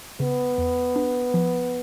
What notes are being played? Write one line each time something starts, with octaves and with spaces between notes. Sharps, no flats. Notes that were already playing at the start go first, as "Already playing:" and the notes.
C#3 B3
E2
D4
F3